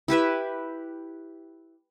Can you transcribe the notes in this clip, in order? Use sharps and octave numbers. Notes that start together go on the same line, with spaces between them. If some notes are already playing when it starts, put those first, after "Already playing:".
E4 G4 B4 E5